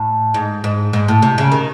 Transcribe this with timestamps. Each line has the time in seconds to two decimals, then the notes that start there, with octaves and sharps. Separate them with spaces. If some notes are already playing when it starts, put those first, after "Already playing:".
Already playing: A2
0.34 G#2
0.64 G#2
0.93 G#2
1.08 A2
1.22 C3
1.38 C#3
1.52 D#3